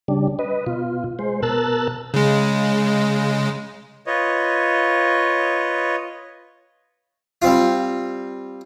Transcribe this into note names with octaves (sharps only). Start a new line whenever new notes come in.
C#3 G3 D4
B4 D#5
B2 F4
G#3 C5
B2 A#4 A5 E6 F#6
C#3 G#3
F4 B4 C#5 D#5
G3 C4 F4